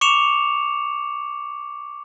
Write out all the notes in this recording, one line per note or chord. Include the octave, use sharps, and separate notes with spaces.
C#6 D6 C#7 E7 F7